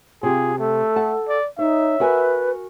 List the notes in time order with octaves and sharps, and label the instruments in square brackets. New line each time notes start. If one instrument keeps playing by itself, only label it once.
[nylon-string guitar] C3 G4 [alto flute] F4 [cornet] G#4
[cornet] A3 [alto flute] A4
[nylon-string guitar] F#5 A5
[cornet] D5
[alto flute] D#4 [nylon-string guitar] C#5 [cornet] E5
[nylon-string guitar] F#4 A#4 G#5 [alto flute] B4